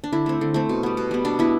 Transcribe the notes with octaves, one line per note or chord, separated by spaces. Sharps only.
D4
D3 E4
A3 C4
D3
A3 C4
B2
G3 B3
B2
G3 B3
B2 D4
B3 E4